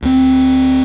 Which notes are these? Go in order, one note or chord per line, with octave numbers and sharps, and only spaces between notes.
D2 C4